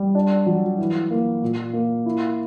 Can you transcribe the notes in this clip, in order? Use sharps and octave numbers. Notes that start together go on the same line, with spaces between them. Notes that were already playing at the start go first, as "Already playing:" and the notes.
Already playing: G3
D4
F#3
E3
A#3
A#2
A#3
E4